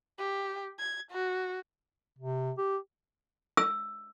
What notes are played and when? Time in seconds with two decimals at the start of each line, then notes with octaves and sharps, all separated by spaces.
0.19 G4
0.79 G#6
1.11 F#4
2.19 C3
2.58 G4
3.57 E6